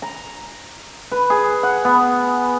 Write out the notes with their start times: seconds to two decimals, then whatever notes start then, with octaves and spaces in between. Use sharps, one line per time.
0.02 A#5
1.11 B4
1.30 G#4
1.63 F#5
1.85 B3